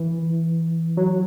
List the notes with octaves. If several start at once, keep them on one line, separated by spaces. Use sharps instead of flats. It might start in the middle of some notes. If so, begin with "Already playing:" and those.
Already playing: E3
F#3